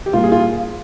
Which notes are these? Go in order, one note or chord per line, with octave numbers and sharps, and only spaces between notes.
G4
A#2 G3 F4
G#4
F4